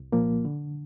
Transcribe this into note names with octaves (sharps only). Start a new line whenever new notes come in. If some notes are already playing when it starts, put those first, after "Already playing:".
Already playing: C2
A#2 F3 A#3
D3